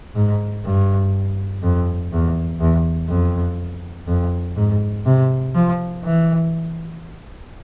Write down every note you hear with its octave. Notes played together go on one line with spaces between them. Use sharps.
G#2
G2
F2
E2
E2
F2
F2
G#2
C3
F3
E3